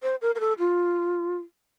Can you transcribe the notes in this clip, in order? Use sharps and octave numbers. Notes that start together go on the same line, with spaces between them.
C5
A#4
A#4
A4
F4